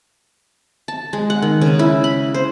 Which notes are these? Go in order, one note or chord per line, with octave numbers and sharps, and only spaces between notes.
A5
G#3
F#5
D#3
C#3
E4
B5
C5